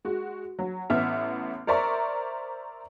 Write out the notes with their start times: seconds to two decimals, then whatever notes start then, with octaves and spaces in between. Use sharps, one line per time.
0.05 G#3 F#4
0.59 F#3
0.90 A1 B3 E5 F6
1.67 A#4 C5 D5 E5 A#5 C#6